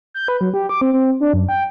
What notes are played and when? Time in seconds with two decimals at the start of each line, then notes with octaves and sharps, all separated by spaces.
0.14 G6
0.28 B4
0.41 F#3
0.54 G4
0.69 D6
0.81 C4
0.93 C4
1.20 D4
1.33 F#2
1.49 G5